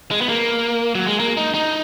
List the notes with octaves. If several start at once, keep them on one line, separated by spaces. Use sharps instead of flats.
G#3
B3
A#3
F#3
G#3
A#3
D#4
D#4